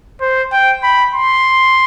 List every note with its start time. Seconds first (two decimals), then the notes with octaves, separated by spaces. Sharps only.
0.21 C5
0.52 G5
0.83 B5
1.14 C6